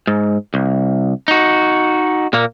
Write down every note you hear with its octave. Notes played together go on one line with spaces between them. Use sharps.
G#2
C2
D#4 F#4
A#2 A#3